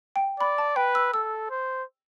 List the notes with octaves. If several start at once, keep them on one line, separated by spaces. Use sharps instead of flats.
G5
D5 B5
A5
B4 G5
E6
A4 E6
C5